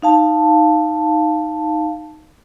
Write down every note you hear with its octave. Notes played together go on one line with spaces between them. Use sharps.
D#4 F5 A5